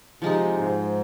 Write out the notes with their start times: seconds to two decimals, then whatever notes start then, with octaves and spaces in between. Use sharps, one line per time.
0.22 C3 F3 G#3 D#4
0.58 G#2